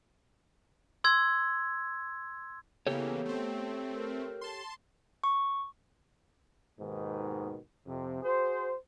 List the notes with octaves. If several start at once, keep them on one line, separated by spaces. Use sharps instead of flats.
C6 E6 G#6
C#3 E3 A#3 B3 G4 A4 C#5
A3 C4
A#4
A5 C6
C#6
D#2 G#2 B2 D#3 B3
F2 C3
F#4 G#4 C5